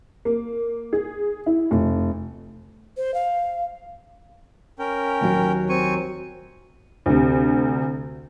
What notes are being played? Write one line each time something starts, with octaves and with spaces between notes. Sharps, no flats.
A#3
G#4
E4
F1
C5
F5
C#4 A#4 G5
D#2 F#3
C4 G#5 C#6
D2 C3